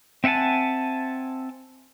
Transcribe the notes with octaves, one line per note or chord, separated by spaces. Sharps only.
C4 E5 F#5 G#5 A5